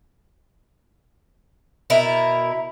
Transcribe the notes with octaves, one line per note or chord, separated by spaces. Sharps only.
B2 E4 A#4